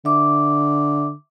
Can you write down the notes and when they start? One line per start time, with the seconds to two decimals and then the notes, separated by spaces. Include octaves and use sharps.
0.05 D3 E5 D6